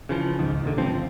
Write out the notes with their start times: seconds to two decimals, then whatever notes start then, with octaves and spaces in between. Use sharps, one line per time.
0.09 C#3 E3 F3
0.39 C#2 G#2 D#3
0.64 D#2 A#2 D3
0.78 D1 C#2 F3 C4
0.94 G1